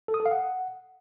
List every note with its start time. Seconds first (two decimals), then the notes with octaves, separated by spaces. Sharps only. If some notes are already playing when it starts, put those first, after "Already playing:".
0.08 A4
0.14 D#6
0.20 A4
0.26 F5
0.31 F#5